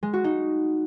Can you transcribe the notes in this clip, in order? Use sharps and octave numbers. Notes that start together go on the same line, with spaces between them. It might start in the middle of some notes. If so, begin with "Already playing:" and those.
G#3
F#4
D#4